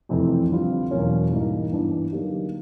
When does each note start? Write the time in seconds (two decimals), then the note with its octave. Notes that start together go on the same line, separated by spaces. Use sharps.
0.09 F2 C3 E3 A3 C4
0.50 D3 G3 C4 F4
0.91 E2 B2 F#3 A#3 C#4
1.31 G#2 E3 G3 A#3 D#4
1.72 G2 E3 G3 B3 D4
2.12 D3 F#3 A#3 D#4 G4